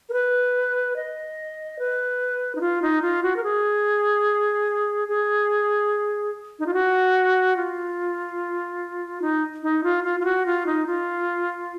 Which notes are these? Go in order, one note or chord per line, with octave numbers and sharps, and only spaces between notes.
A#4
B4
D#5
B4
D#4
F4
D#4
F4
F#4
A#4
G#4
G#4
D#4
F4
F#4
F4
D#4
D#4
F4
F4
F4
F#4
F4
D#4
F4